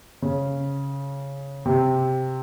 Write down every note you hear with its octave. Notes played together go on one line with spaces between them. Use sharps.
C#3
C3